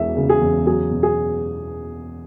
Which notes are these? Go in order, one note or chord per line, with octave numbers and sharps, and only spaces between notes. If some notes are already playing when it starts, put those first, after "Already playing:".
Already playing: E1 E2 E3 E5
C#3
G#4
E2
F#3 G#4
B2
G#4